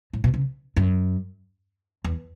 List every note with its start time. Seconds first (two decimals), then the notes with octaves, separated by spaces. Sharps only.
0.13 A2
0.24 B2
0.34 C#3
0.76 F#2
2.04 E2